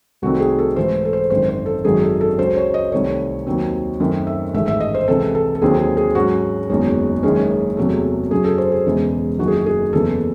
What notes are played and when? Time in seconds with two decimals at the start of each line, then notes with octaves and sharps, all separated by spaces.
0.22 C2 C3 D#3 A3 C4 F#4
0.40 G#4
0.59 A4
0.76 G#2 E3 A3 C5
1.05 A4
1.13 C5
1.30 G#1 F#2 D#3 C5
1.49 C5
1.66 A4
1.85 G#1 F#2 D#3 F#3 C#4 G#4
2.02 A4
2.21 A4
2.38 C#2 C#3 F#3 C5
2.57 C#5
2.74 D#5
2.92 C2 C3 D#3 A3 C#5
3.47 D#2 D#3 F#3 C4
4.00 F#2 D#3 A3 C4
4.27 E5
4.54 A1 G#2 D#3 A3 E5
4.68 E5
4.80 D#5
4.94 C5
5.08 C#2 C3 E3 A4
5.35 A4
5.55 A4
5.62 D#2 D#3 F#3 C4 G#4
5.79 G#4
5.97 G#4
6.15 G#2 F#3 C#4 F#4
6.70 F#1 E2 D#3 G#3 C#4
7.23 F#1 F#2 D#3 G#3 C#4 G#4
7.77 E2 C3 F#3 A3
8.31 F#2 C#3 F#3 G#4
8.44 A4
8.58 C5
8.72 G#4
8.86 E1 E2 C#3 E3 G#3
9.38 F#1 F#2 D#3 F#4
9.48 G#4
9.56 F#4
9.66 G#4
9.93 F#1 E2 C#3 E3 A4